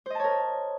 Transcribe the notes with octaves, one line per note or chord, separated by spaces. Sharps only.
A#4 C5 C#5 D#5 A5